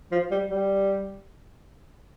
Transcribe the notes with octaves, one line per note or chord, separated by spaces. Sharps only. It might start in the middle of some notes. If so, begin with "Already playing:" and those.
F3
G3
G3